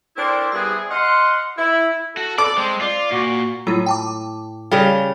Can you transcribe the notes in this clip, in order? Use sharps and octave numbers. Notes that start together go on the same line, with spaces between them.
C4 D4 E4 A4 A#4 C5
G3 B3 C4 E4 G#4
D#5 F5 F#5 C6
E4
F#4 A4
A4 D5 D6
G#3 C4
F4 D5
A#2 F#4
A2 F#3 F4
G5 A5 D6
C#3 G3 G4 A4 F5